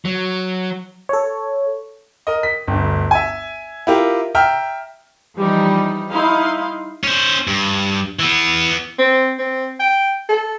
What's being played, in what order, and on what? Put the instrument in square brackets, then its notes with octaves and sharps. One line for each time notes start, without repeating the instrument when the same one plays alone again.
[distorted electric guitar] F#3
[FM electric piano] A4 C#5
[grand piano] A#4 D#5
B6
G1 D2
E5 G#5
E4 F4 G4 A#4
E5 G5 A#5 F6
[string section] E3 F3 G3 D#4
D#4 E4 F5 C6
[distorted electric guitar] C#4 C5
G2
E3 B3
[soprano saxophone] C4
C4
G5
A4